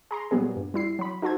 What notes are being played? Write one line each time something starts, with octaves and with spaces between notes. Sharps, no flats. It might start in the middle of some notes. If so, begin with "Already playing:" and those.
G#4 A#5 C6
A#2 F#3 G3 B3 G#4
G2
G3 E4 C7
F#3 B5
D#4 F#4 A4 C5 G#6